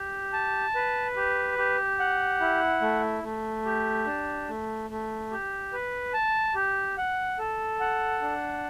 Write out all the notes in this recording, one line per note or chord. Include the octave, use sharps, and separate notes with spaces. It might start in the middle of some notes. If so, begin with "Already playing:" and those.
Already playing: G4
A5
B4
G4
G4
F#5
E4
A3
A3
G4
D4
A3
A3
G4
B4
A5
G4
F#5
A4
F#5
D4